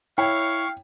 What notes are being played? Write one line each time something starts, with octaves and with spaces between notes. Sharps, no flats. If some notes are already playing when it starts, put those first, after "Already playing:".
E4 C#5 F5 G5 C#6